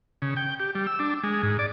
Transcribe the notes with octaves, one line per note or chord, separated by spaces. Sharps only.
C#3
G5
G4
G3
E6
D4
G#3
G#2
D5